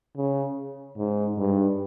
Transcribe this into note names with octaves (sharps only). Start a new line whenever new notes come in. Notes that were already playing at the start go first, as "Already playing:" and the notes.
C#3
G#2
G2